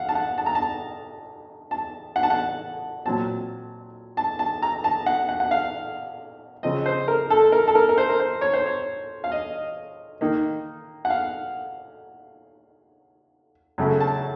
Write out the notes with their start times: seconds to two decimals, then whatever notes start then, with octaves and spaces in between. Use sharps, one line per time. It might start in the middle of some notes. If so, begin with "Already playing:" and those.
Already playing: F5 F#5
0.09 A5
0.15 F#5
0.38 A5
0.46 A#5
0.55 A5
1.71 A5
2.16 F#5
2.23 A5
2.30 F#5
3.05 A#2 F#3 C4 A5
4.17 A5
4.39 A5
4.62 A#5
4.84 A5
5.06 F#5
5.29 F#5
5.40 F#5
5.51 F5
6.63 C#3 F3 C4 D#5
6.86 C5
7.08 A#4
7.30 A4
7.52 A#4
7.68 A4
7.75 A#4
7.89 A#4
7.98 C5
8.09 A#4
8.20 C5
8.41 C#5
8.53 C5
8.66 C#5
9.24 F5
9.32 D#5
10.21 D#3 A#3 D#4
11.05 F#5
11.10 F5
13.78 F#2 C#3 A3
14.00 A5